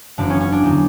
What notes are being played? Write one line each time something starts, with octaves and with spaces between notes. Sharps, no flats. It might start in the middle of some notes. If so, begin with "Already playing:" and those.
F#1 F#2 E3 D4
C#4
C#4
D4
E2 D3 F#3